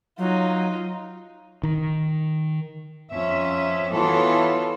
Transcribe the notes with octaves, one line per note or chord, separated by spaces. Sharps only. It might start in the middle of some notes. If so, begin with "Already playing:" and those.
F#3 D#4 F4
D#3
F2 C#4 E5
E3 B3 F4 F#4 A4 C#5